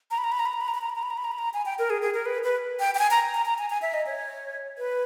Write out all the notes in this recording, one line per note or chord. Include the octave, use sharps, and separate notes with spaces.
A#5
B5
A#5
B5
A#5
B5
A#5
B5
A#5
B5
A#5
B5
A#5
B5
A#5
B5
A#5
B5
A#5
G#5
G5
A#4
G#4
G#4
A#4
B4
B4
G5
G5
G#5
A#5
A#5
A#5
G#5
G#5
E5
D#5
C#5
B4